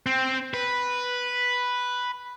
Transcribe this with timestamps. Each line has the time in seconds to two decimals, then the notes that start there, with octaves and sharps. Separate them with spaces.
0.06 C4
0.54 B4